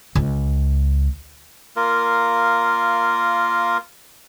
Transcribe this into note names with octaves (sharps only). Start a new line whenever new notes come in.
C#2
A#3 F4 A#4